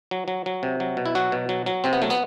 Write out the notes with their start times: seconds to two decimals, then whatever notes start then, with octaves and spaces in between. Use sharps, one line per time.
0.11 F#3
0.28 F#3
0.46 F#3
0.63 C3
0.80 F#3
0.97 B2
1.06 E4
1.15 F#3 F#4
1.32 B2
1.49 F#3
1.66 F#3
1.84 C3 C4
1.93 B3
2.02 F#3 A3
2.10 B3